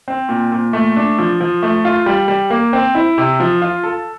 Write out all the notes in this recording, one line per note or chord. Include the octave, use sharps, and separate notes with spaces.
C4
A#2
A#2
A3
D4
F3
F3
A3
F4
G3
G3
A#3
C4
E4
C3
F3
F4
A4